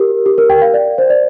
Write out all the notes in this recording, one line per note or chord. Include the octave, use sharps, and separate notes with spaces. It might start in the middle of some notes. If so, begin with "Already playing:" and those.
Already playing: G4 A#4
G4
A#4
G5
F5
D5
C5
D5